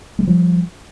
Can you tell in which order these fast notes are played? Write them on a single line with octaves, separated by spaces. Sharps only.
G#3 G3 F3